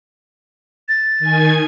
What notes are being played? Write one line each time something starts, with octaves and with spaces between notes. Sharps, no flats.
A6
D#3 G#5 G#6